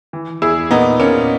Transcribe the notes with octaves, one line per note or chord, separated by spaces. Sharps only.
E3
E2 E4 G#4
A#2 B3 D#4
A#2 A#3 C#4